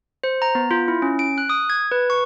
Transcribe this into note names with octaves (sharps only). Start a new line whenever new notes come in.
C5
A#5
B3
F4
E4
C#4
D7
F#6
D#6
G#6
B4
C#6